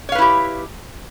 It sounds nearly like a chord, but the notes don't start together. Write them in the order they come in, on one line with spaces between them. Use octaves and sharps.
C#5 F5 B4 E4 G4